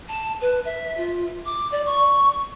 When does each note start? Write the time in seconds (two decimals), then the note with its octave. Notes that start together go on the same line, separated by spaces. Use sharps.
0.09 A5
0.41 B4
0.65 E5
0.97 F4
1.45 D6
1.72 D5
1.86 C#6